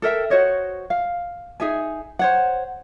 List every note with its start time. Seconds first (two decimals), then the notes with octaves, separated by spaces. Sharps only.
0.02 A4 A#4 E5 G5
0.30 F#4 C5 C#5 D#5
0.90 F5
1.60 D#4 G#4 E5 G#5
2.19 C5 C#5 F#5